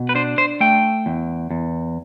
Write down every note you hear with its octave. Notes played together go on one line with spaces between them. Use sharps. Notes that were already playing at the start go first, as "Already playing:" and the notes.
Already playing: B2
B4
D4 C5
C5
A3 G5
E2
E2